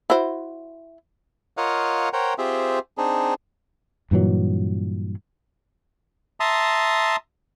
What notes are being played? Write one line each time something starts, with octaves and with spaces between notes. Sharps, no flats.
E4 F#4 C5
F4 A#4 C#5 D#5 F5 F#5
A#4 C5 C#5 F#5 G5 A#5
C4 F4 G4 G#4 C5 E5
C4 D4 D#4 G#4
G2 A#2 E3 F#3
E5 A5 A#5 C6 D#6